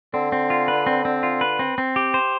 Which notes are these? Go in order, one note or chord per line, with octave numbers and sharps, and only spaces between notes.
D3 C4
C4
F4
B4
C4
C4
F4
B4
C4
C4
G4
C5